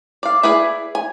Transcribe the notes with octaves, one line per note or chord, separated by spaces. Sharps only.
D5 F5
E4 G#4 B4 D5 G#5
G#5